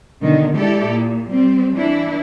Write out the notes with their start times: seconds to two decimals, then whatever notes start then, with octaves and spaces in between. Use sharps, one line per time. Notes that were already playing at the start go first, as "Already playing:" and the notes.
0.21 B2 D3 D#3
0.53 G#3 E4 G4 A4 D5
0.86 A#2
1.29 G3 C4
1.73 E3 D4 E4